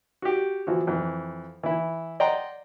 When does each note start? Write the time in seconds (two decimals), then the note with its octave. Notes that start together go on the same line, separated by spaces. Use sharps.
0.22 F#4 G4
0.67 E3 F3 F#4
0.87 F2 E3
1.63 E3 E4
2.20 D5 D#5 F#5 G5 A#5 C6